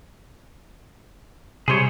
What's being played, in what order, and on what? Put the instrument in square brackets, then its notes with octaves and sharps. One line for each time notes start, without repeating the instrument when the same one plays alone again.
[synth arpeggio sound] C3 G3 [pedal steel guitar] G#4 C5 C#5